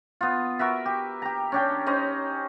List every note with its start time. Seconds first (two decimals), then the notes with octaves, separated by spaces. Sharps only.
0.21 B3 F4
0.59 F#4 A#4 B4 E5
0.85 G4
1.22 G4 A#5
1.52 C#4 D4 G5
1.87 C#4 D#4 C5 D#5